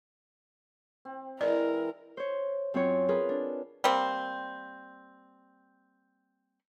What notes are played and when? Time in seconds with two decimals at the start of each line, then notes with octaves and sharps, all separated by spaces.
1.05 C4
1.41 E3 G#3 E4 A#4 D5
2.17 C5 C#5
2.74 F#2 C4 F4 C#5
3.09 F4 G#4 A#4 B4
3.29 D4
3.84 G3 A#3 C4